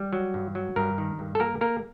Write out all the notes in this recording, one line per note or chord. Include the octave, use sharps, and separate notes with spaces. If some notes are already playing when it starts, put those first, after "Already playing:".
Already playing: G3
F#3
G2
F#3
G2 A#4
D#3
G2
A4
A#3 A#4
A#3 A#4